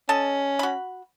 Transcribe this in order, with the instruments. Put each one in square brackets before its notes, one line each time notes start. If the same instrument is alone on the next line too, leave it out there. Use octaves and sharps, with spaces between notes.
[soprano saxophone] C#4 [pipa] A4 D#5 A5
[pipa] F#4 B5